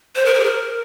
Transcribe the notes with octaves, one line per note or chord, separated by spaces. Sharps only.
C5
A#4
C5
G#4
A#4